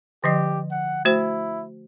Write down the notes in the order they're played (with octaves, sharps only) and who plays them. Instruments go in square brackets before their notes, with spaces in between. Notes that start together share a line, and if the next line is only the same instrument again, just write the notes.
[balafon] D3 F3 D#5 [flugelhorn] G4
[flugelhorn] F#5
[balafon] A3 F#4 C5 [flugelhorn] E4